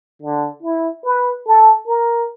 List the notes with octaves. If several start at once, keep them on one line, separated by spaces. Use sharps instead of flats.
D3
E4
B4
A4
A#4